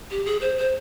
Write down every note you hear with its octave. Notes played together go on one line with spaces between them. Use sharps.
G4
G#4
C5
C5